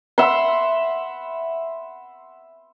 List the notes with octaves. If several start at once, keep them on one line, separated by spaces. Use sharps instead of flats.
E5 F#5 B5 C6